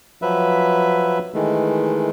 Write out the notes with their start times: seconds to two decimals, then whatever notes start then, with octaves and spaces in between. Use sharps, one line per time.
0.22 F3 F#3 B4 E5
1.34 D#3 E3 G#3 A3